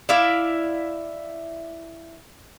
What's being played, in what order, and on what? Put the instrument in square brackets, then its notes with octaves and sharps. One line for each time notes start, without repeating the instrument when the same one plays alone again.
[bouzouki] E4 D5 E5 F5